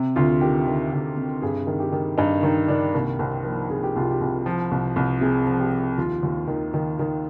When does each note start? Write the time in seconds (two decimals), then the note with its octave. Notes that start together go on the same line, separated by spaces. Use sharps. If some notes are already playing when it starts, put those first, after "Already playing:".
Already playing: C3
0.16 D2 F4
0.41 D#3 G4
0.67 D#3
0.92 D2
1.17 C3
1.42 G2 G#4
1.67 D#3
1.80 G4
1.92 D#3
2.18 G2 D#4
2.43 D#3 D#4
2.68 D#3 D4
2.94 C2 A#3
3.19 C2 C4
3.44 F3 A#3
3.69 C2 G#4
3.83 G4
3.96 C2 F4
4.10 G4
4.21 C2
4.46 F3
4.71 C2
4.96 C2
5.21 C3 G#4
5.47 F3
5.60 G4
5.72 F3
5.98 D#2 F4
6.23 D#2
6.48 D#3
6.74 D#3
6.99 D#3